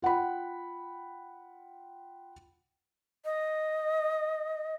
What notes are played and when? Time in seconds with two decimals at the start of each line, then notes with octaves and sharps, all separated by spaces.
0.02 F4 F#5 G5 B5
3.25 D#5